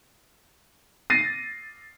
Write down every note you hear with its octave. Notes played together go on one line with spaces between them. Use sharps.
A6 A#6 C7 D#7